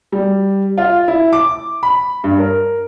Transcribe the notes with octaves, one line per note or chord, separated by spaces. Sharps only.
G3
F4
E4
D6
B5
G2
A#4